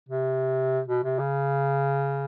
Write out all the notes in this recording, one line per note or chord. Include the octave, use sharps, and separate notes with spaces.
C3
B2
C3
C#3